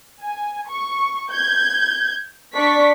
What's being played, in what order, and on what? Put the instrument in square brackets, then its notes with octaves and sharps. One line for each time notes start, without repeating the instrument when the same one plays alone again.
[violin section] G#5
C#6
G6 G#6
D4 D5 C#6 B6